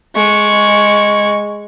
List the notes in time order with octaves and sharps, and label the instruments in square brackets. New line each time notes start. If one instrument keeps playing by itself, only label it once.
[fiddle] G#3 C#6